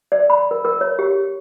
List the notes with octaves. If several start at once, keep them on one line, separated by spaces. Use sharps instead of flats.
D5
B5
A#4
A#4
C#5
G4